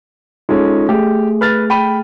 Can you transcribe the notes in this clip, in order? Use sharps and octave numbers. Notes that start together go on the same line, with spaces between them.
G#3 C#4 D#4 F4 A4
A3 G4 G#4
B4 F6 A6
G5 B5 D#7